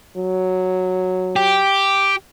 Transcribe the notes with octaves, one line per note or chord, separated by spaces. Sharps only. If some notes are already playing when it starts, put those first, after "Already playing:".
F#3
G4